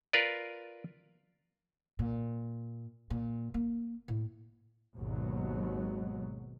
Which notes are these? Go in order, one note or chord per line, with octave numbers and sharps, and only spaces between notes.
F4 A#4 B4 D5
A#2
A#2
A#3
A2
G#1 D#2 B2 F#3